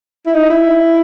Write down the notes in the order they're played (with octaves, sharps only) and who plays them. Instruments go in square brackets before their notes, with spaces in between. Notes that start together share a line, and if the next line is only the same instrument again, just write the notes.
[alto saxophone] E4
D#4
E4